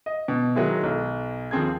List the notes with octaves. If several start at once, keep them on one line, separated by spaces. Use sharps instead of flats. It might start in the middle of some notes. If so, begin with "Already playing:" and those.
D#5
B2
D#3 F#3 G#3 E4
B1
D#2 F3 C4 G#4 G#6